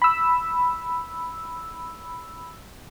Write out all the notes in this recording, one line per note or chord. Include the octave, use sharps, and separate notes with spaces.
B5 E6